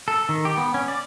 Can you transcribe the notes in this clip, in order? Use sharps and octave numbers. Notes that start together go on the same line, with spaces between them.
A4
D#3
G4
B3
C#4
D5